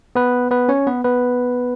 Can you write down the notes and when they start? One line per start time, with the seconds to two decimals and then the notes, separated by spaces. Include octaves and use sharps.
0.15 B3 B4
0.51 B3 B4
0.69 C#4 C#5
0.87 B3 B4
1.04 B3 B4